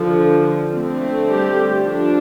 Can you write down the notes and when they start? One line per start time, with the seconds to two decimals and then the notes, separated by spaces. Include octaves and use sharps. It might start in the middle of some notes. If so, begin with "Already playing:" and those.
Already playing: D3 F3
0.73 D3 A3 C4
1.28 G3 G4
1.82 F3 D4